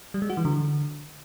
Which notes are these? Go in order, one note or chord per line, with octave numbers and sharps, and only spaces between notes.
G3
G#3
F#4
E3
D3